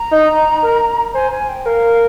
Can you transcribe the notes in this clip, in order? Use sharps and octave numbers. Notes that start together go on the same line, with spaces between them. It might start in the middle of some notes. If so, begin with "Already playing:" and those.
Already playing: A#5
D#4
A#4
C5 G#5
G#5
G5
A#4 F5
F5